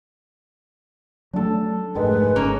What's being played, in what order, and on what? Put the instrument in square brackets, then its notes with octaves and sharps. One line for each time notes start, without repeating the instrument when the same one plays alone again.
[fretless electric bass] F#3 A3 C#4 [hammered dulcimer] D4 A4
[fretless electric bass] F1 G#2 A3 [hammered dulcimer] D#3 G#3 [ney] B4
[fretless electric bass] G#1 [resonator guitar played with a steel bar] A#3 C#4 C#5